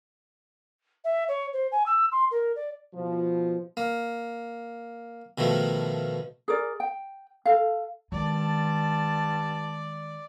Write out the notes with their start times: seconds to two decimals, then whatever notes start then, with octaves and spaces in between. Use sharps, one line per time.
1.04 E5
1.28 C#5
1.53 C5
1.72 G#5
1.86 E6
2.12 C6
2.31 A#4
2.56 D5
2.95 B2 F3
3.77 A#3
5.38 B2 D#3 F3 A3
6.48 G#4 A#4 D5
6.80 G5
7.45 A4 F5
8.12 G2 D#3 G#3 D5 A5